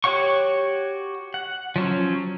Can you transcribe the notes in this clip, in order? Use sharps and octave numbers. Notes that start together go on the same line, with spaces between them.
F#4 G4 C#5 F#5 C#6
F#5
F3 F#3 C#4